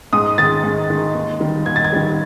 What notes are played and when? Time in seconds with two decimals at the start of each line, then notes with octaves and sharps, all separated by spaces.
0.13 G#2 D#6
0.38 D#3 G#3 A6
0.64 G#2
0.90 D#3 G#3
1.15 D#2
1.40 D#3 G3
1.66 D#2 G#6
1.76 A6
1.84 G#6
1.93 D#3 G3